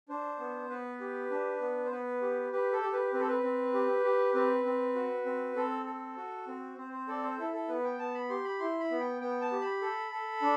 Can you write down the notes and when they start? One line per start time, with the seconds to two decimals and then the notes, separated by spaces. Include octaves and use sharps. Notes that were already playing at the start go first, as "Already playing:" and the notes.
0.09 D4 C5
0.39 B3
0.70 B3 B4
1.00 G4
1.30 D4
1.61 B3
1.85 C5
1.91 B3 B4
2.21 G4
2.52 G4 B4
2.72 A4
2.82 G4
2.93 B4
3.13 C4 B4
3.20 A4
3.28 B4
3.43 C4
3.74 G4
4.04 G4
4.34 C4 B4
4.65 C4
4.95 F#4
5.25 C4
5.56 C4 A4
5.86 A4
6.17 F#4
6.47 C4
6.78 C4 C5
6.93 C5
7.08 A4 D5
7.23 C5
7.38 E4 A4
7.54 A4
7.68 B3 B4
7.84 G5
7.99 B3 A5
8.14 B5
8.29 G4 C6
8.44 B5
8.60 E4 C6
8.80 B5
8.91 B3
9.00 G5
9.21 B3 G5
9.41 A5
9.52 G4
9.61 B5
9.81 A4
10.11 A4
10.42 D4